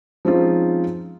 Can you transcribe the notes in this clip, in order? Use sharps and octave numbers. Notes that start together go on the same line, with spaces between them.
F3 G#3 C4 C#4 D#4 F4